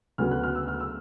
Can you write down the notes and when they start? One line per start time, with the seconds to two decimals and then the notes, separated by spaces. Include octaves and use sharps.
0.18 D2 C#3 F#3 B3 F6
0.31 F#6
0.43 F6
0.55 E6
0.68 F6
0.80 E6